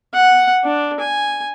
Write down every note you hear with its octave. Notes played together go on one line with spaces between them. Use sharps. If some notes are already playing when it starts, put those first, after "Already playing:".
F#5
D4
G#5